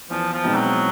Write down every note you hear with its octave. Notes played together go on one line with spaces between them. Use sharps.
E2 F3
F3
B2 G#3 C4 D#4
F#3